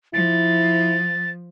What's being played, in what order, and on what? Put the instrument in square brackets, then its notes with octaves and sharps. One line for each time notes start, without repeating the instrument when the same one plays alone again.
[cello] F3 [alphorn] E4 [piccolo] A6